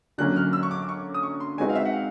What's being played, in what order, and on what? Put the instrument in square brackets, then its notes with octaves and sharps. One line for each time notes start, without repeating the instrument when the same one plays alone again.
[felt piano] D3 F#3 A#3 C#4 [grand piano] F#6
[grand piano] F6
E6
C#6
D6
D6
C#6
D#6
C#6
C6
[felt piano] G#3 C4 D#4 F#4 B4 [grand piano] G#5
[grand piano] F5
E5
F#5
F5